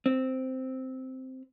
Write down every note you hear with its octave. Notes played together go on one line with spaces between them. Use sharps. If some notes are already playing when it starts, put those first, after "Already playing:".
C4